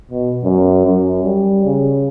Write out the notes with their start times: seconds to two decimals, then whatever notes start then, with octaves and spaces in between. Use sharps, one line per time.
0.11 B2
0.44 F#2
0.86 F#2
1.23 G3
1.65 C#3